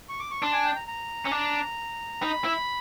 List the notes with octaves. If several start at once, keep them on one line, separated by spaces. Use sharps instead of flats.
C#6
D6
C#6
D4 C6
G#5
G5
A#5
A#5
C#4
D4
D#4 B5
E4